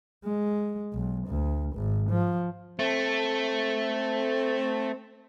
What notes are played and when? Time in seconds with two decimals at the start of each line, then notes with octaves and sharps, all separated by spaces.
0.25 G#3
0.93 B1
1.28 D2
1.75 G#1
2.10 F3
2.79 A3 C4